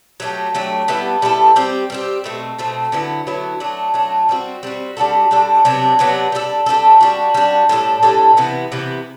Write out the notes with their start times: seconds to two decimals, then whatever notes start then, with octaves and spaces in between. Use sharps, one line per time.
0.20 F#3 A3 D4 G4
0.55 F#3 A3 D4 G4
0.88 G3 B3 E4 A4
1.22 G3 B3 E4 A4
1.56 G3 C4 G4
1.90 G3 C4 G4
2.24 B2 A3 C4
2.59 B2 A3 C4
2.92 D3 F#3 B3 E4
3.27 D3 F#3 B3 E4
3.60 F#3 A3 D4
3.94 F#3 A3 D4
4.29 G3 C4 F#4
4.63 G3 C4 F#4
4.97 G3 D4 F#4 A4
5.31 G3 D4 F#4 A4
5.65 C3 F#3 B3 D4
5.99 C3 F#3 B3 D4
6.32 G3 D4 F#4 A4
6.66 G3 D4 F#4 A4
7.01 G3 D4 F#4
7.34 G3 D4 F#4
7.69 A2 G3 D4 A4
8.03 A2 G3 D4 A4
8.37 C3 E3 B3 E4
8.72 C3 E3 B3 E4